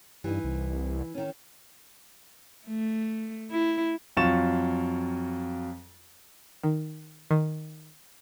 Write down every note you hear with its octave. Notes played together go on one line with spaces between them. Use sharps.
G2 E3 D#4
C2
D#3 C#4
A3
E4
F2 F#3 F4 C#6 A6 E7
D#3
D#3